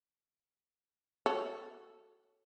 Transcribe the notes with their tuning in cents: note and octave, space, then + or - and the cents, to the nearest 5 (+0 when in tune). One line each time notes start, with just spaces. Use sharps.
F#4 +0 A4 +0 C#5 +0